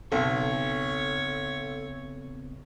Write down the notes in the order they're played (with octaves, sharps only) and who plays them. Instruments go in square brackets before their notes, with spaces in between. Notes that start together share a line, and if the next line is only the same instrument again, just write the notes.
[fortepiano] B1 [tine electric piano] C#3 B3 C4 [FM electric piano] A4 [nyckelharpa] C#5